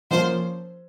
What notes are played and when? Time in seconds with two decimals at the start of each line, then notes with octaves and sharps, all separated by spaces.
0.11 F3 A#3 C#4 F4 C5